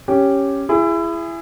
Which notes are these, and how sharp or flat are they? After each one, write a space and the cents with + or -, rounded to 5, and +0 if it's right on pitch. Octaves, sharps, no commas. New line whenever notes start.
C#4 +0 G4 +0
E4 +25 G#4 -10